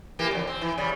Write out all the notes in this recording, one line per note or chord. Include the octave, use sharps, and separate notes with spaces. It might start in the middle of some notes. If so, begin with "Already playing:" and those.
E3 A#3 G4
F2 D3
C4
E3
C#3 G3